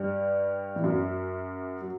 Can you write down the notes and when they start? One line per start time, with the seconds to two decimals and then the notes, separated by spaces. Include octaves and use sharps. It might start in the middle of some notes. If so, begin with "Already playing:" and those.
Already playing: G2 G3
0.76 E3
0.84 F#2 F#3
1.82 F#3